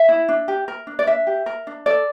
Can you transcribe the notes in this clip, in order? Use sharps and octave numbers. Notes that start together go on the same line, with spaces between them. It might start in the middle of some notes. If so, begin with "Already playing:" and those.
Already playing: E5
E4
D4
G4
A#4
D4
D5
D4 E5
G4
A#4
D4
A4 D5